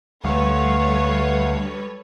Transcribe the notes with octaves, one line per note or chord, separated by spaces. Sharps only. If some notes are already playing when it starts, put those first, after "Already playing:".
D2 G3 A3 A4 B4 C#5 F5 F#5